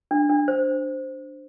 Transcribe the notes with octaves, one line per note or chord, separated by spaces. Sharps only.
D4
D4
C5